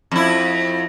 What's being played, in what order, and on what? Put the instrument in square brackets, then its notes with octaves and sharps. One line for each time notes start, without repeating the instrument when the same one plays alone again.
[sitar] F2 E4